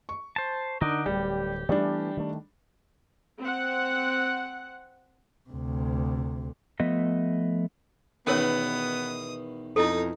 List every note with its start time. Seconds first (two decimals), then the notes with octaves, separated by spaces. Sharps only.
0.09 C#6
0.36 C5 A5
0.81 D3 D4 D#4 A#4
1.06 D1 G3 G4
1.69 E3 G3 A3 B3 D4
2.17 D#3 A3
3.39 C4 F#5
5.50 D2 C3
6.80 F3 A3 B3 D#5 E5
8.27 E2 B2 D#3 B3 C#4 A#4 C#5 D#6
9.76 F2 D#4 E4 A4 D#6